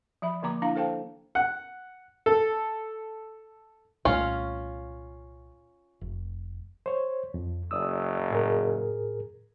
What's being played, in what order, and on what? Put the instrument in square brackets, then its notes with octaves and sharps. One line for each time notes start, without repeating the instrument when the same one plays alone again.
[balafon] F3 E5 B5
D3 F3 A#3 A#5 D6
D4 E4 F5 A#5
A4 C5 F5 G5 A5
[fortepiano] F#5
A4
[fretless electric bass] C2 A#2 A3 [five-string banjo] C#4 F4
[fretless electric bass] F1
[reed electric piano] C5 C#5
F2
[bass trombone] F#1 [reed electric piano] D5 D#6 E6
[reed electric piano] A2 G#4 A#4